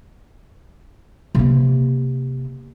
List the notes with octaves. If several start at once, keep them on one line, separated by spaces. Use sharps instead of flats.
C3 A#3